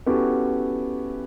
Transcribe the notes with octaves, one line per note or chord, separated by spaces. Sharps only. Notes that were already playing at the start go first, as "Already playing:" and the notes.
B3 C#4 E4 F#4 G4 A4